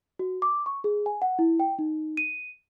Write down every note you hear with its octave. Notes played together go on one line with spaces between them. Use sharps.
F#4
D6
C#6
G#4
G#5
F#5
E4
G5
D#4
D#7